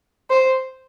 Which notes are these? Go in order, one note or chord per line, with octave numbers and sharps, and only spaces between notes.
C5